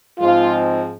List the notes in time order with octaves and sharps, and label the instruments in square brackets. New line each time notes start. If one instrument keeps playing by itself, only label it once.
[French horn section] G#2 F3 G#3 C4 F4